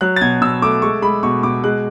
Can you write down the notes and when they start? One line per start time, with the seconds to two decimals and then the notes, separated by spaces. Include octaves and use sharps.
0.01 F#3 F#6
0.16 A6
0.21 B2 G#6
0.41 B2 E6
0.62 A3 D6
0.82 G#3 C#6
1.02 G#3 B5
1.23 B2 C#6
1.43 B2 D6
1.64 G#3 F#6